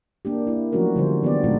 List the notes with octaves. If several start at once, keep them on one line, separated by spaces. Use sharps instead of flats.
A#3 D4 G4
A#3 E4
F3 F#3 A3 C#4 F#4 A#4
D3 F3 G3 C5
E3 B3 G4 D5
A#2 G#3 A3 D#4 F4 A4